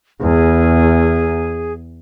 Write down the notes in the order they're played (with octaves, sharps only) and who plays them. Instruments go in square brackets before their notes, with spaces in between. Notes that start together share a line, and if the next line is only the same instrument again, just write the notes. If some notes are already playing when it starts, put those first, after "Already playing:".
[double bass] E2 [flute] G#4